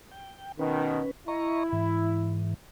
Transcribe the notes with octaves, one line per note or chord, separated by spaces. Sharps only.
G5
B2 D#3 C#4 B4
E4 D#5 A#5 C#6
G#2 E3